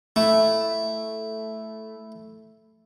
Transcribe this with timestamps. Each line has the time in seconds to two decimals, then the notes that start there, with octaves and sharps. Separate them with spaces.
0.16 A3 E4